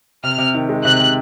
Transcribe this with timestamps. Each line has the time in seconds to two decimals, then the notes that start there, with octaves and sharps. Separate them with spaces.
0.24 C3 F6
0.39 C3
0.54 D#3
0.69 G#3
0.85 C3 F#6
1.00 C3